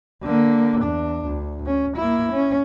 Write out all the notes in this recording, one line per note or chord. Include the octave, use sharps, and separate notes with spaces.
D3 A#3
E2 D4
D2
C#4
A#3 E4
C#4